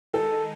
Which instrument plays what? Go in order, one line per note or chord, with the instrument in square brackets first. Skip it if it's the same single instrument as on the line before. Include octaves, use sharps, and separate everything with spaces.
[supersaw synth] D#3 G#3 D#4 [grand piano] A4